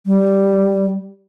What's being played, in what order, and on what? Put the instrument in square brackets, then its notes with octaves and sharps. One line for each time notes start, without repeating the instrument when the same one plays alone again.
[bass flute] G3